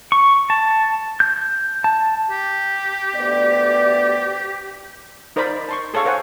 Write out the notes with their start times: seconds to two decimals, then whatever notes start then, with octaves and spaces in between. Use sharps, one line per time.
0.12 C#6
0.50 A5
1.20 G6
1.84 A5
2.31 G4
3.15 D2 B3 D5
5.36 D#4 A#4 C5 D5 B5
5.69 A5 C6 C#6
5.94 G#4 A4 C#5 F5 C#6
6.05 A#4 C5 C#5 F#5 G#5